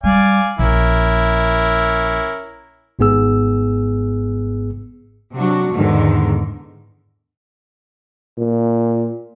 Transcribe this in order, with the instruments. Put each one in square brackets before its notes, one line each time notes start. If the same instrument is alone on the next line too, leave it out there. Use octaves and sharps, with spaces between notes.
[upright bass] G3 [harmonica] D5 F5 G#5
[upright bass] A#1 [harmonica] C#4 E4 A#4
[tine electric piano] G#1 G#2 B3 G#4 E6
[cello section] C3 F#3 D4 F#4
E2 G#2 D3 D#3
[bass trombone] A#2